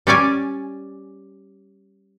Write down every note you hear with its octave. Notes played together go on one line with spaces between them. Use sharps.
G3 C#4 D5 G#5